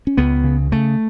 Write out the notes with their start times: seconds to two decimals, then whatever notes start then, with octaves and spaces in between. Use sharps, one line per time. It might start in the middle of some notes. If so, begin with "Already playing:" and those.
0.07 C#4
0.18 C#2 B3
0.44 C#3
0.72 C#3 A3